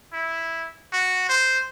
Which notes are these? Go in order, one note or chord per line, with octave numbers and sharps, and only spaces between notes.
E4
F#4
C5